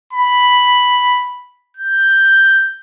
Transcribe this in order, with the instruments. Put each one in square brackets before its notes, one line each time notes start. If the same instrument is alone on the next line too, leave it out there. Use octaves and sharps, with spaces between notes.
[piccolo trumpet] B5
G6